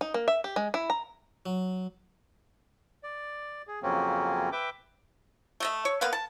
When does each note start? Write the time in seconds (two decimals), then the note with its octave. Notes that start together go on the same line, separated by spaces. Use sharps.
0.01 D#4
0.14 A#3
0.28 E5
0.44 G4
0.56 G#3
0.74 E4
0.90 A#5
1.46 F#3
3.03 D5
3.67 G#4
3.83 F2 C#3 F#3 A#3 C4 C#4
4.52 B4 E5 G5 D6
5.60 A3 D#5 E5
5.85 C#5
6.01 A#3 B3 B4 F5
6.13 A5